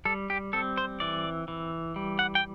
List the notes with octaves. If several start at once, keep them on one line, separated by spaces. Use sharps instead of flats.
G3 A4
G4
C4 A4
C5
E3 D5
E3
G3
F#5
G5